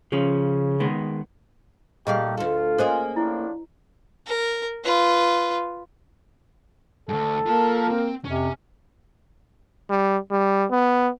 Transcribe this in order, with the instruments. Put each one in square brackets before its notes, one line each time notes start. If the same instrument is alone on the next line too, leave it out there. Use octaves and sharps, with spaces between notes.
[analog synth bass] C#3 [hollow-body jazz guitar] F3 C#4
[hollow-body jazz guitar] D#3 G#3 B3
[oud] A#2 G3 F5 [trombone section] A3 D#4 G4 [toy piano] G#4 D#5
[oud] D2 A4 [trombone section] F4
[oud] A#3 C#4 G#4 [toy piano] A4 C5 D#5
[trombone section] A2 F3 D4 [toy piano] E4
[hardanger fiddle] A#4
F4 B4
[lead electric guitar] D2 G2 [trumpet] A4
[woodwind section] A#3 A#4 [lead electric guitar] F4 A5
[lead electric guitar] C4
[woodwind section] F2 C3 [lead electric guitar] C#4
[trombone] G3
G3
B3